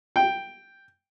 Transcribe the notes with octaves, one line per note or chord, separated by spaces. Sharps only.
G5